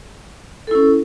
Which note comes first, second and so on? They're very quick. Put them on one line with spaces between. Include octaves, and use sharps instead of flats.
A4 E4 C#4